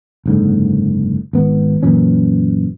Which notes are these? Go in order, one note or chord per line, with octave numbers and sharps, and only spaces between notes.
F#1 G#2 D3
G#1 B3
F#2 A#2 E3 C#4